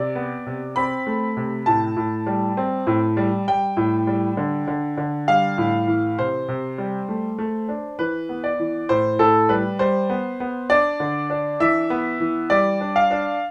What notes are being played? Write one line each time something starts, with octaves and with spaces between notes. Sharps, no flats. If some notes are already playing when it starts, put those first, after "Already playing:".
Already playing: C3 D5
B3
C3
C4 B5
A3
C3
A2 A5
A2
G3
C4
A2
G3
G3 G5
A2
G3
D3
D3
D3
G3 F5
A2
E3
C3 C5
C3
G3
A3
A3
D4
E3 B4
B3
D5
E3
A2 C5
A2 A4
G3 B4
G3 C5
B3
B3
D4 D5
D3
D4
E3 E5
B3
E3
G3 D5
D4
F5
D4